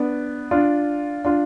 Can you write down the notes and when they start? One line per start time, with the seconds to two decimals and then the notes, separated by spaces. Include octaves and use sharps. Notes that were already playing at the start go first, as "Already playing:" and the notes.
Already playing: B3 D4
0.51 D4 F4
1.25 D4 F4